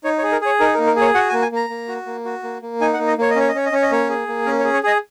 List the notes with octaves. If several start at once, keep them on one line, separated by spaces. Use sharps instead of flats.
D#4 C#5
C#5
G#4
A#4
G#4 C#5
D#4 A#4
A#4
A#3
A#4
G#4
C#5
F#4 F#5
G#5
A#3
G#5
A#3 A#5
A#3
F#4
A#3
F#4
A#3
A#3
D#4 G#5
F#5
A#3
D#5
A#3 C#5
D#5
C#4 C#5
D#5
C#4 C#5
D#5
C#4 C#5
D#5
A#3 C#5
G#4
A#3
C#4 A#4
C#5
G#4
C#5
G#4 D#5